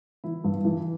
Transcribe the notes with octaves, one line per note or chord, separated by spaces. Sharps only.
E3 E4
G2
E3